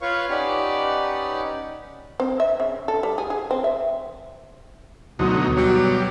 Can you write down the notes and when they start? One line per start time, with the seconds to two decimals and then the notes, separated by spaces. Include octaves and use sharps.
0.01 F4 B4 C#5 F5 C#6
0.30 C#4 D#4 G4 B4 D5 F#5
2.20 C4
2.40 E5
2.60 C#3
2.88 A4
3.03 G3
3.18 G#4
3.30 G#4
3.51 C4
3.64 E5
5.19 D2 B2 F#3 D#4 F#4 C6 D#6
5.57 F#3 G3